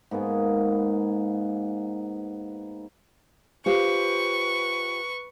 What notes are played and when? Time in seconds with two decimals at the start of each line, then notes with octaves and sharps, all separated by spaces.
0.11 G#2 A#3 B3 G#4
3.66 F4 G4 B4 C5 C#6